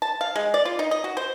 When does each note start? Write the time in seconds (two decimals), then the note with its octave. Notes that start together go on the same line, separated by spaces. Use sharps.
0.02 A5
0.21 F5
0.36 G#3
0.54 D5
0.65 F4
0.79 D#4
0.91 D#5
1.04 F#4
1.17 C5